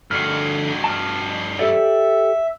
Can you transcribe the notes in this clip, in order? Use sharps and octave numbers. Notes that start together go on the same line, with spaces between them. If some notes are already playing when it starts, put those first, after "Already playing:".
G2 D3 F#4 F6
A5 F6
G4 A4 D5 E5